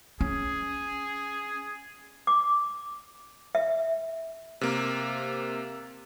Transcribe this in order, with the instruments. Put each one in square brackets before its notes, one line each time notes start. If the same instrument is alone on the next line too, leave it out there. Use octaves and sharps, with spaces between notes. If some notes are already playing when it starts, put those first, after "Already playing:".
[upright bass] C#4 [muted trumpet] G#4
[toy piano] D6
E5
[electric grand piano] C3 A#3